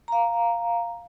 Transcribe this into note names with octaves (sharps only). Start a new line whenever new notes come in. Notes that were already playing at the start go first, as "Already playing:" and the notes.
F5 A#5